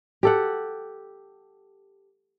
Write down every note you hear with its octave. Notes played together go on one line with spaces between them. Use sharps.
G4 A4 F#5